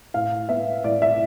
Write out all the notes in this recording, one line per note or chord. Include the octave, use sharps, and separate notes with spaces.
A2 F5
B3 E5
A2 D5
E5